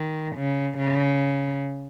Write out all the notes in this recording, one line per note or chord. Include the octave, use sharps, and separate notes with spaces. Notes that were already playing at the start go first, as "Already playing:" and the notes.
Already playing: D#3
C#3
C#3